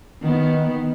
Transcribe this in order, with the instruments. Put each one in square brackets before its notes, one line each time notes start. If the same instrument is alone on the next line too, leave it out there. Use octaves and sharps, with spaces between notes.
[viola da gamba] D#3 B3